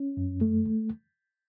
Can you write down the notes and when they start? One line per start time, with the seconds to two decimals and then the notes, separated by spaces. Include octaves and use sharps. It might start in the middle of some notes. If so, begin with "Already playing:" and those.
Already playing: C#4
0.17 F#2
0.41 A3